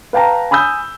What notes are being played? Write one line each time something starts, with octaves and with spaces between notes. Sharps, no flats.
B4 F5 G5 A5 A#5
G#5 B5 D#6 E6 G6